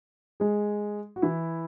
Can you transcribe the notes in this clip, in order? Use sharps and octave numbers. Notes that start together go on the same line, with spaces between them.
G#3 G#4
F#4
E3 E4